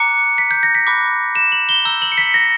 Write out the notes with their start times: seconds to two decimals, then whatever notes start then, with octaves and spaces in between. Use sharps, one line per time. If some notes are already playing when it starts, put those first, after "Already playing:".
Already playing: A#5 D6 F#6 C#7
0.38 B6
0.51 G6
0.63 A#6
0.75 B6
0.87 B5 D6 F#6
1.35 E7
1.52 F#7
1.69 G7
1.85 A#5 E6 G6 G7
2.02 F#7
2.12 C#7
2.18 B6
2.34 A#6